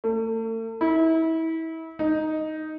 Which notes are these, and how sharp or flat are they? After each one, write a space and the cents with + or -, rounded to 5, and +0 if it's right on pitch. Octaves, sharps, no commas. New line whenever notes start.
A3 +40
E4 -30
D#4 +0